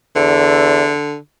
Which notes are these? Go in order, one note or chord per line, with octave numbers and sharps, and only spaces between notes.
E2 D3